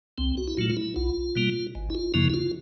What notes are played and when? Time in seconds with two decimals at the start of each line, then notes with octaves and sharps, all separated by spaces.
0.18 C2 C4
0.37 F#4
0.48 E4
0.57 A#2 F#3 A3 F4
0.70 F4
0.77 E4
0.96 B1 F4
1.36 B2 G3 A#3
1.75 G#1
1.90 E4
1.95 F4
2.14 F#2 C#3 F3 A#3 E4
2.30 E4
2.34 F4